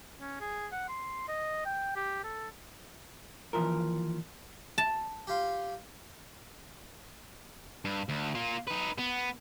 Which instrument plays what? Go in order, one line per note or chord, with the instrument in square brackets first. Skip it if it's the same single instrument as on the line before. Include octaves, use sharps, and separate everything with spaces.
[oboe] C#4
G#4
F#5
C6
D#5
G5
G4
A4
[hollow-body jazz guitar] D#2 E3 F3 A#4
[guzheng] A5
[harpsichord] F4 G4
[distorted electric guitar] G2
D2
A#3 F4
D#4 B4
B3